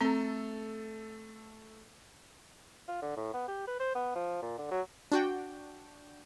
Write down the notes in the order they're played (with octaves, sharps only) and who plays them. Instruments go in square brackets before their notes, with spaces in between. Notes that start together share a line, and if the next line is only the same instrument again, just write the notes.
[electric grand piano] A3 A4 [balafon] C4 A#5
[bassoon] F4
D3
A2
B3
G4
B4
C5
B3
F3
A#2
D3
F#3
[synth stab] D4 F#4 G5